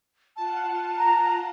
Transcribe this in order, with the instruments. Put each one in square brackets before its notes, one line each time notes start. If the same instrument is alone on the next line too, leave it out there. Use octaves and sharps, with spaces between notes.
[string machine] F4 F#5 [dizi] A5
[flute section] A#5